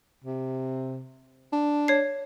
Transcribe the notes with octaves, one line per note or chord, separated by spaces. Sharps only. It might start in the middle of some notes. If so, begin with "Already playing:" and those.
C3
D4
C#5 C7